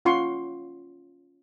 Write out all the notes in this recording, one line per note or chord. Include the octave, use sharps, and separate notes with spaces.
C#4 F4 F#5 C6 C#6